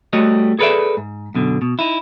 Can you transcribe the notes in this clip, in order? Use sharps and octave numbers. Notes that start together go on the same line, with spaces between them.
G3 A3 F#4 C#5 D#5
G#4 A4 B4 C#5 D5 E5
G#2
F#2 B2 D3
B2
D#4 E4